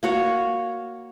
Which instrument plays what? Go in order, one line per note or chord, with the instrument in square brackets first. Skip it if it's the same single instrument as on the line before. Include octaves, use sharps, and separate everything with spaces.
[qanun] A#3 F#4 C#5